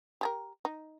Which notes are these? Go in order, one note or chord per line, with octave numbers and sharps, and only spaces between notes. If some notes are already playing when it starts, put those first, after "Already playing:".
G4 G#4 A#4
D#4